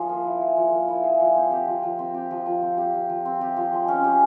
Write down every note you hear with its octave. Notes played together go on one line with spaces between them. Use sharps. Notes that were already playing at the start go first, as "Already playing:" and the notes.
Already playing: F3 G#4
A#3
E4
G#4
F3
A#3
E4
G#4
F3
C4
G4
F3
F3
C4
G4
F3
F3
C4
G4
F3
F3
C4
G4
F3
G#3
C#4
G4